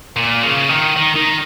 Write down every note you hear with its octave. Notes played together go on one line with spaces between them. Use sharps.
A#2
C#3
D#3
D#3
D#3